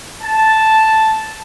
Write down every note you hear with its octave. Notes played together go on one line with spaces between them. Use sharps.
A5